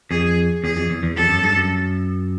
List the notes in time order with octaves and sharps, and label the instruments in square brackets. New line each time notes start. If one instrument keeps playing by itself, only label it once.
[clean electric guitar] F2 [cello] G#4
[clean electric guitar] E2 [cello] G#4
[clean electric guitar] F2
E2
E2
[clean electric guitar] F2 [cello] A4
[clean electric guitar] F#2
G2
F#2